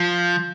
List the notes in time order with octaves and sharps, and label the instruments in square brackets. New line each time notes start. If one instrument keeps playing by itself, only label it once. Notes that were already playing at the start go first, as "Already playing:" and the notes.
Already playing: [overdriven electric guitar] F3